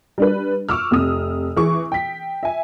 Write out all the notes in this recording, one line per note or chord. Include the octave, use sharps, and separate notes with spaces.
G3 D4 B4
C#6 D6 E6 F6
F1 C3 D#6
E3 G#4 C#6 D6
G5 B6
E5 G#5